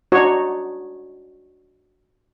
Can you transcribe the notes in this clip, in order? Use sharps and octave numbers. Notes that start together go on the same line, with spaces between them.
D4 D#4 F#4 C#5